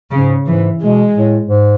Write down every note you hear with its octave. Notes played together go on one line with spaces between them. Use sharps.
G#2 C#3
G#2 E3
B2 G#3
A2
G#2